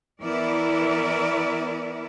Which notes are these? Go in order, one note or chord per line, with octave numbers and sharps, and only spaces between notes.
E3 B3 E4 A#4 D5